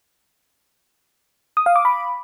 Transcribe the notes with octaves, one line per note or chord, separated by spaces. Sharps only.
D#6
F5
D6
B5